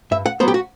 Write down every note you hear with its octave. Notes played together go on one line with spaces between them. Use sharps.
G2 E5
F#5
F#3 B3 C5
G4
F#4